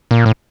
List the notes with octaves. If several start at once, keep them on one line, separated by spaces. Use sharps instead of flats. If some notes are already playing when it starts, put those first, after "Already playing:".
A#2
A2